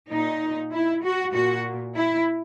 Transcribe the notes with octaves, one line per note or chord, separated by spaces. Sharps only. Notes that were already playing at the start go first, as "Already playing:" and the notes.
A#2 D#4
E4
F#4
A#2 F#4
E4